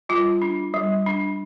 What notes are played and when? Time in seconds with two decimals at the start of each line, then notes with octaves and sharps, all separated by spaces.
0.09 G3 F4
0.42 D4
0.74 G3
1.06 D4